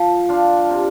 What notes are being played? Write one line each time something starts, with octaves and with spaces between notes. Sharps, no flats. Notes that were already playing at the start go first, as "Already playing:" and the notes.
Already playing: F3
D4 F4
C3